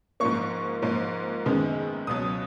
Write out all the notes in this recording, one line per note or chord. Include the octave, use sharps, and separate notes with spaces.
G#2 F3 A#3 C#6
G#2 F3 A#3
F#2 D#3 G#3 B3
C#2 B2 F#3 D#6